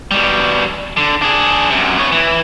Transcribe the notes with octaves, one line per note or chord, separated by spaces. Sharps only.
B2 G3
D3
D4 G#4
F#2 C3
B3 C#5
E3